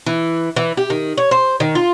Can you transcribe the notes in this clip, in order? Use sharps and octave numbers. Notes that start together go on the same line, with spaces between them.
E3
E3
G4
D#3
C#5
C5
D#3
F4